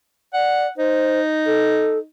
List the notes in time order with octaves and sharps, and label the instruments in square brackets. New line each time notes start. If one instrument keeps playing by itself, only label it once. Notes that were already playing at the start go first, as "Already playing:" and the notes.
[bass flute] D5 [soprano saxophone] F#5
[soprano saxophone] D#4 [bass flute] C5
[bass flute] A4